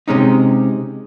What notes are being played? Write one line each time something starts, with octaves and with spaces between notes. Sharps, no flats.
C3 G#3 C#4 D#4